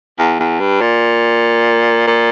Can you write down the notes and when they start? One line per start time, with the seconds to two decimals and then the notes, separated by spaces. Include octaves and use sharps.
0.18 E2
0.39 E2
0.60 G2
0.81 A#2
2.07 A#2